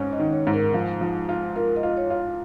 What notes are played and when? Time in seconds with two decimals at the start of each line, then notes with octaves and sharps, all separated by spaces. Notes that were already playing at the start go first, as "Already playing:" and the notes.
Already playing: G#2 C#4
0.13 D#5
0.20 D#3
0.33 C#5
0.47 G#2
0.54 A#4
0.74 F3
1.01 F3
1.29 F4
1.56 F4 A#4
1.76 D#5
1.83 F4
1.97 C#5
2.10 F4